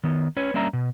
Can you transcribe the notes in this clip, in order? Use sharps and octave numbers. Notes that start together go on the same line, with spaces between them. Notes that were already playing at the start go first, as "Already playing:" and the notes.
D#3 B3
C#4 B4 C#5
G3 A#3 C#4 D4 E5 A#5
B2